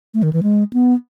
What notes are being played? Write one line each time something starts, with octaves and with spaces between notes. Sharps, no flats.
A3
D#3
E3
G#3
B3